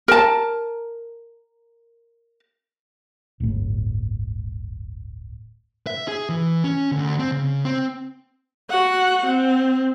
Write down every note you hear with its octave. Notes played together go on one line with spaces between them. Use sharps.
A#4 A5
D1 G1 A2
E5
G#4
E3
C#4
D2
C4
C#3
C4
F#4 F#5
C4